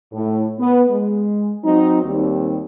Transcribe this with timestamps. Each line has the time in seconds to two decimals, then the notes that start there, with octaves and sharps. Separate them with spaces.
0.12 A2
0.58 B3
0.90 G#3
1.63 F#3 C4 D#4
2.03 D#2 G3 C4